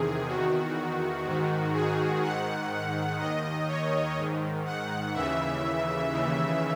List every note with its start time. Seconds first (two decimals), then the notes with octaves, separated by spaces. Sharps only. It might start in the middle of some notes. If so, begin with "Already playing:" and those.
Already playing: E2 C3 D#3 G#4
0.27 E2 D#3 F#4
1.25 G#2 D#3
1.73 G#4
2.23 G#2 D#3 F#5
3.19 D#2 D#3 D#5
3.68 C#5
4.17 G#2 D#3
4.65 F#5
5.14 D#2 C#3 E3 E5
6.12 D#2 C#3 E3